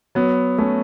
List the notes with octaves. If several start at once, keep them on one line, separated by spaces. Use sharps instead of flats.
F#3 B3
A3 C#4